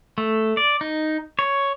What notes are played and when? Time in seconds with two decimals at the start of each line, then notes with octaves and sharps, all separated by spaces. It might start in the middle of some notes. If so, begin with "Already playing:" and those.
0.18 A3
0.57 D5
0.81 D#4
1.39 C#5